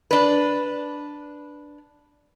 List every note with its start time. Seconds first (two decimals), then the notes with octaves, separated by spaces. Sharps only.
0.11 D4 B4